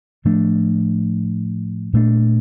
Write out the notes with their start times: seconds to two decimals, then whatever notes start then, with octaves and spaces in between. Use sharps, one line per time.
0.25 A2 F3 A3 D4
1.93 A#2 A3 D4